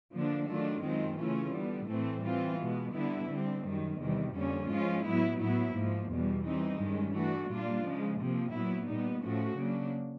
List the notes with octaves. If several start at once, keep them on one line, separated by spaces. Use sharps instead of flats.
D3 F3 A#3 D4
D#3 F#3 A3 D4 F4
F#2 D#3 G#3 C4 F4
C#3 E3 A3 C#4 F4
D3 G3 B3
A2 E3 A3 C4
E3 G3 C4 F4
B2 G#3 B3
D3 G3 B3 E4
D3 G3 C4
F#2 D#3 G3
E2 C3 D#3 G3
F2 D3 G3 A#3 C#4
G#2 F3 G#3 C#4 F4
A2 F#3 B3 E4
A2 F#3 B3 E4
G#2 F3 A#3
E2 B2 G3
E3 G3 C4 D#4
G2 D#3 G#3 C#4
E3 A3 D4 F#4
A#2 G3 A#3 D4 F4
C#3 F3 G#3
C3 F3 A#3
A#2 F#3 B3 E4
A#2 G3 B3 D#4
A2 F3 A3 C#4 F#4
C#3 F#3 A#3 D4